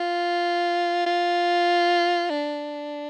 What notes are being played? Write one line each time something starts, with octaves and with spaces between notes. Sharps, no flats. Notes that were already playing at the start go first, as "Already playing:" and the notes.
Already playing: F4
F4
D4